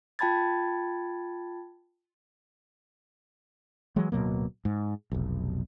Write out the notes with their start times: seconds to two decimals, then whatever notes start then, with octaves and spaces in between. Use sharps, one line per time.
0.19 F4 G5 A5 B5 G#6 A6
3.96 E3 F#3 G#3
4.12 D1 B2 F#3 A#3
4.65 G#2
5.11 F1 B1